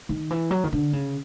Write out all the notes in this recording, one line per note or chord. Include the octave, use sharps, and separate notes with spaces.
D#3
E3
F#3
D#3
D3
C#3